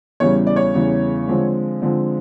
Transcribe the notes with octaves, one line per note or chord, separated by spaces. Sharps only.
E2 C#3 E3 G3 C#5
D5
C#5
E2 C#3 E3 G3
D3 F3 G#3 C4
D3 F3 G#3 C4